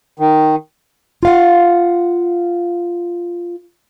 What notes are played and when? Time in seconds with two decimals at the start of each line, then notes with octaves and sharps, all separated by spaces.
0.19 D#3
1.23 F4 F5 F#5